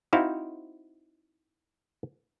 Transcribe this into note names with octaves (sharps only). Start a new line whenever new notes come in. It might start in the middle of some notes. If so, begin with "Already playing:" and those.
C4 D#4 E4 F#4 C5 F5